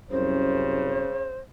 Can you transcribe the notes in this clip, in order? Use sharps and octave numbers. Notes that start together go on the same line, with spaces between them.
C2 F#2 C#3 C#4 C5